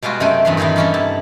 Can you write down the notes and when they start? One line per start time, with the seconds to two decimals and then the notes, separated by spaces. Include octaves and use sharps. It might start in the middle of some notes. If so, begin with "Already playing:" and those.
0.03 B2 G3 G#3 F4 F#4
0.20 F#2 C3 A3 C4 G5 G#5
0.45 E2 G2 B3 C4 E5 C6
0.57 A#2 D#3 E3 C4 D#4
0.76 G3 A#3 C#4 D#4 A4
0.94 C3 E4 A5